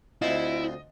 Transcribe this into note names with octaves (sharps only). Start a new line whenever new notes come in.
D2 C4 E4 F4 D#5